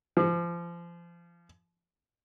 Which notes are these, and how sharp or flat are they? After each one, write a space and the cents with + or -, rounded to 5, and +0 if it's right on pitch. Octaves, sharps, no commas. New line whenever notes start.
F3 -30